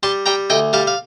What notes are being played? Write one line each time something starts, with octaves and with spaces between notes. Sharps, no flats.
G3 A5 C6
G3 G5 A#5
D2 D#5 G5
G3 F5 A5
F5